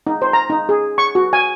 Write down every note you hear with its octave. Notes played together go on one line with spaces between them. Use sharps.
D#4
C5
A#5
D#4
G#4
C#6
F#4
G#5